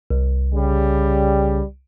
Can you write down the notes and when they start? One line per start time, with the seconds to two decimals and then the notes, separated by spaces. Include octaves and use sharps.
0.11 C2
0.54 C#3 G3